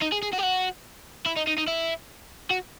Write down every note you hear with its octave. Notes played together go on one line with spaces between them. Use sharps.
D#4
G#4
G#4
F#4
G4
F#4
E4
D#4
D#4
D#4
E4
F#4